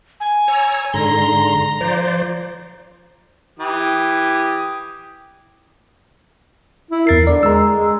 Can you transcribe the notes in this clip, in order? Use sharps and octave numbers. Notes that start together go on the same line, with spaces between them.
G#5
C#5 A#5 E6
G#2 D3 A#5 C6
F3 C5 D5
E3 G4 D#6
E4
E2 A#4 A6 C7
D3 D5
G#3 A#5 E6
G#3